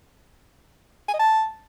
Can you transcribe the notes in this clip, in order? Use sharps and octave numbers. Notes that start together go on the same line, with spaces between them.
G#5
D#5
A5